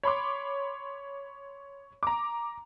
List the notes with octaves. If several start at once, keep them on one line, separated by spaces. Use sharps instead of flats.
C#5 B5 C6 D6
A#5 D6